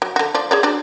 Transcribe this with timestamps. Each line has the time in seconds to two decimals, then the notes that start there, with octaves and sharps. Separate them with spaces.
0.02 F#3
0.16 D3 F#4
0.34 F3 D5
0.51 G#4 C#5 D5
0.63 D4 F#4 D5